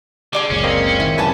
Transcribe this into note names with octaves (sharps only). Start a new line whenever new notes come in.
D3 G#4 D5 D6
F#1 C#2 A#2 C#4
A#3 C4 D#5
D#3 E4
F#2 C3 B4 G#5 A5